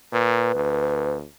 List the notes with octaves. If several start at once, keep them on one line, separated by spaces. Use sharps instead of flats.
A#2 B4
D2